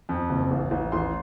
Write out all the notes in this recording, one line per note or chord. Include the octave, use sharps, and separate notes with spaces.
F2
F#1
A1
A1
A1 C6